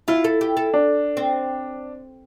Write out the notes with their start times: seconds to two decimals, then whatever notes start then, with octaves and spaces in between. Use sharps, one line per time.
0.08 E4 F4
0.24 A4
0.41 G4
0.57 A4
0.74 D4
1.17 C4